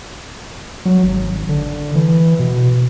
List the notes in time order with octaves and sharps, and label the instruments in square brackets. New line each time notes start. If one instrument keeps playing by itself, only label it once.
[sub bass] F#3
G#1
D3
E3
B2